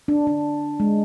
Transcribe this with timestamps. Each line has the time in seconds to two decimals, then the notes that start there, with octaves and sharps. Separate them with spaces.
0.08 D4
0.27 D4
0.80 G#3